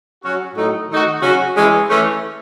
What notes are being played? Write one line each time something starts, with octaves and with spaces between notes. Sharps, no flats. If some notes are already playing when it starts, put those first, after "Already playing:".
F#3 C#4 F#4
A2 F#3 A3 D#4
D#3 A3 D#4 F#4
C#3 F#3 C#4 F#4
E3 G#3 C#4
E3 A3 C#4